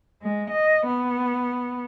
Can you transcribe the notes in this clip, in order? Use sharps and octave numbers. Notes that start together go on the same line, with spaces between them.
G#3
D#5
B3